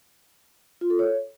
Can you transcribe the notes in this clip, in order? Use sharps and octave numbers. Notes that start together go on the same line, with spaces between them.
F4
A4
C#5